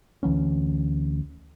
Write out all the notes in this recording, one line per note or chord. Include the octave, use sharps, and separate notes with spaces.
D2 E3 B3 C#4